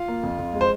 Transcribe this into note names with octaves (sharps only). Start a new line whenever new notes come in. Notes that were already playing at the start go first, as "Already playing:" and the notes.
Already playing: F4 F5
A#3
F2
F2
G#3
C5